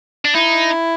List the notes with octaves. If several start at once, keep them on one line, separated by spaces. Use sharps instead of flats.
D4
D#4 E4